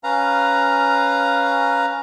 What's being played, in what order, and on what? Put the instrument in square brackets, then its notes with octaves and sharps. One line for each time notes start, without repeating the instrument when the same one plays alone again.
[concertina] C#4 B4 F5 A#5